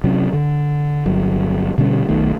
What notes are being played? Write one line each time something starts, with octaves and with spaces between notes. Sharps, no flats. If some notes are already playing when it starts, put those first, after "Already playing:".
C3 F#3 C#4
D3
G1 F#3
B2 D3 G3 C#4
B1 B2 D#3 A3